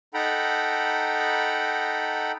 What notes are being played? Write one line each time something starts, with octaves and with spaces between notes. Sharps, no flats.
D#4 A4 F#5 G5 A#5 B5